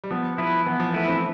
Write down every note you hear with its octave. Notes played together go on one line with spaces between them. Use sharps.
G3
F3 B3
F3 E4 B4
E3 B3
F3
A3 E4 B4
C4